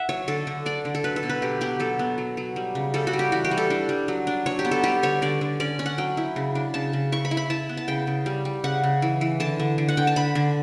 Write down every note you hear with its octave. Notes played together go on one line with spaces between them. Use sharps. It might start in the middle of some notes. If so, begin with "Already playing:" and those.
Already playing: E5 F#5
F#3 C#5
D3 A4
D3
D4 D5
D3
A4
F#3 B4
A4
B2
B4
F#3 G4
B3 G4
F#3 A4
B3
F#3
F#3
G3
C#3
G3 A4
F#4
G3
G4
E3 F#4
G4
G3
A4
D4
G3
F#3
D4
F#3 C#5
G4
B3
A4
G3 G4
D3 C#5
D3 D5
D3
C#4 D5
C#4
F#5
F#3 G5
E4
C#3
D4
C#3 A5
C#3
E4 C#6
B5
E4
B5
E4 A5
B3
A5
C#3 G5
C#3
G3
G3
C#3 F#5
C#3
E3
E3
D3 A5
D3
D3
F#5
D3 G5
A5
D3 B5
D3